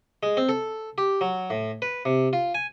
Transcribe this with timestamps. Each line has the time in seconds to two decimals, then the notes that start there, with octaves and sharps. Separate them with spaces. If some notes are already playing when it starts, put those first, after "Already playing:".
0.23 G#3
0.37 C4
0.49 A4
0.98 G4
1.21 F#3
1.50 A2
1.82 B4
2.05 C3
2.33 F4
2.55 G#5